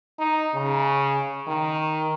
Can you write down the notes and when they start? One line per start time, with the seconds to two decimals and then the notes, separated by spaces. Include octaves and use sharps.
0.19 D#4
0.54 C#3
1.48 D#3